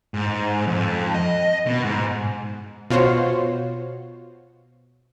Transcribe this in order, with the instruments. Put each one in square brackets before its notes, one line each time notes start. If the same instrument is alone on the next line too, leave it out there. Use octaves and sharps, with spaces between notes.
[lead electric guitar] G#2
F2
D#5
B2
G#2
[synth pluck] B2 F4 F#4 C5 C#5